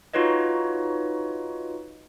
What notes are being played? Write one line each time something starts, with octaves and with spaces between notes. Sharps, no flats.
D#4 F4 F#4 B4 C#5 D#5